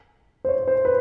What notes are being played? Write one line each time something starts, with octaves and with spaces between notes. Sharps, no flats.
C5
C#5
C5
B4